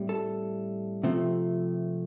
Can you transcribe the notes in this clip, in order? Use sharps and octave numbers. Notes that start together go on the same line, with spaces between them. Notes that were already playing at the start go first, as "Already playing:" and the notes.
Already playing: A2 G3 C4
A4
C3 F3 A3 C4